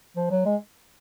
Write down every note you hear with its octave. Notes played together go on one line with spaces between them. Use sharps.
F3
F#3
G#3